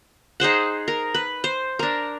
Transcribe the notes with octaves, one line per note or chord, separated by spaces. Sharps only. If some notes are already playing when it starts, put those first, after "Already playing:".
D#4 G#4 C5 F#5
A#4
B4
C5
D4 A#4